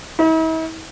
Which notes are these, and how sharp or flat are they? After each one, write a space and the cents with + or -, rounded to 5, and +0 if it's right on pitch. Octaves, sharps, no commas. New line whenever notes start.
E4 -45